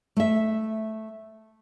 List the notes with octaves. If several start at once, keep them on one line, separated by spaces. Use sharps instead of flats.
A3 E5